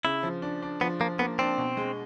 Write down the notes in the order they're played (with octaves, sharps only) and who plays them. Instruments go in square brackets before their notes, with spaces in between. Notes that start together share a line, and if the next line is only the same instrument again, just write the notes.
[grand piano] C#3 [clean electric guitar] E4
[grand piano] F3
D4
D4
[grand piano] F3 [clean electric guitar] B3
[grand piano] F3 [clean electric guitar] A#3
[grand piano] A#3 [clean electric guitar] B3
[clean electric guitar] C4 [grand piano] D4
[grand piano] B2
G#3